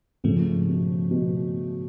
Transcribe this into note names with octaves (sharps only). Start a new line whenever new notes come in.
G#2 C#3 F3 A3
B2
B2